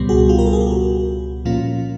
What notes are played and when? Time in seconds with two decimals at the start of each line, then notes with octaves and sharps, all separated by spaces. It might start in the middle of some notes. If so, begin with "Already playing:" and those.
Already playing: C#2 B2 G3 B3
0.09 F#4 G#4
0.29 F4 G4
0.39 A#4
0.46 A4
0.53 G#4
0.61 G4
0.67 F#4
1.45 A#2 F3 A#3 C#4 F4